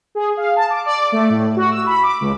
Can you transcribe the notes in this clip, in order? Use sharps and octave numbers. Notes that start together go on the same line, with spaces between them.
G#4
F5
A5
D6
D5
A3
A2
F#4
E6
B5
D6
C#2